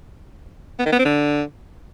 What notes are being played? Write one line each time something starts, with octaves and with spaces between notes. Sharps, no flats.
B3
D#3
B3
C4
D3